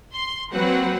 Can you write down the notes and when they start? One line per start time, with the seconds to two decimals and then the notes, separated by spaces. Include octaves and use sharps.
0.13 C6
0.52 F#3 A#3 C4 F#4 B4 F#5